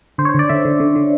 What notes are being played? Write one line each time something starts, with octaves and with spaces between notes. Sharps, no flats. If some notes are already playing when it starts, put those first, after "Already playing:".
D3 C5
C#5
C5
D3 D5
D3 E5
D3
D3
D3